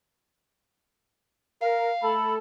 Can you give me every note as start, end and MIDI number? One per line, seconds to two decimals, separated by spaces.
1.62 1.89 70
1.62 2.15 77
2.03 2.38 57
2.03 2.38 69
2.03 2.34 83